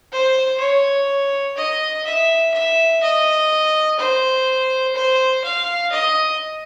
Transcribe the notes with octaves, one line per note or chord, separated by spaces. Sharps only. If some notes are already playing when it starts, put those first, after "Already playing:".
C5
C#5
D#5
E5
E5
D#5
C5
C5
F5
D#5